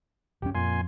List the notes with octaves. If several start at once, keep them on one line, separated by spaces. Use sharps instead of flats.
D1 F#2 C#4 G4
F2 A#2 G#5 C6